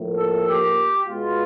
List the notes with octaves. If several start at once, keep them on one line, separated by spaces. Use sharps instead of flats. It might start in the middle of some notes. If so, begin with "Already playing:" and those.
Already playing: A2 F3 A#3
A4
G4
B2 G#3 B3 F4